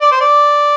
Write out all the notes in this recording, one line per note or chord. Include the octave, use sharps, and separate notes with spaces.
D5
C5
D5